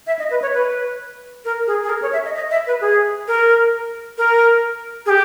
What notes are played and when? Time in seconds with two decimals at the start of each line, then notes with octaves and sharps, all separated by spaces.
0.07 E5
0.19 D#5
0.30 B4
0.42 C#5
0.53 B4
1.45 A#4
1.67 G#4
1.83 G#4
1.89 A#4
2.02 C#5
2.13 E5
2.25 D#5
2.35 D#5
2.51 E5
2.67 B4
2.81 G#4
3.28 A#4
4.18 A#4
5.06 G#4
5.10 G4